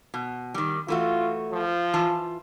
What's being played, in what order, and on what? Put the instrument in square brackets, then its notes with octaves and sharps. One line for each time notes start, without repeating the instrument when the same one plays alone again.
[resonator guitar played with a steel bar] B2
D#3 G3
[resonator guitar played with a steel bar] E3 A3 F#4 [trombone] F4
[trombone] F3
[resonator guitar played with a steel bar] E3 F4 A5